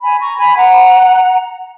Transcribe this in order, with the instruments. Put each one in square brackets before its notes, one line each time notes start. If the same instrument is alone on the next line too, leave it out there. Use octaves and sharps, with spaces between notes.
[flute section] G#5 B5
A#5 C#6
G#5 B5
F#5 A#5